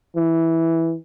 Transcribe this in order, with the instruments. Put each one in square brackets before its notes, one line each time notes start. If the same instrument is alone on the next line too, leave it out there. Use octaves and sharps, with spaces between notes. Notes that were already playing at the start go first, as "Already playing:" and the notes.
[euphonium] E3